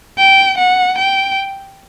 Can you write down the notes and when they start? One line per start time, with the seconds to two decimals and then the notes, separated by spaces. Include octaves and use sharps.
0.18 G5
0.58 F#5
0.99 G5